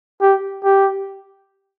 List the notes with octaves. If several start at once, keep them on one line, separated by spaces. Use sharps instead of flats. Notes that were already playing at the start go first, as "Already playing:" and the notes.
G4
G4